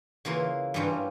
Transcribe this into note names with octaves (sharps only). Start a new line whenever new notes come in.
C#3 E3 A#3 F4 A#4
G2 E3 G3 C#4 F4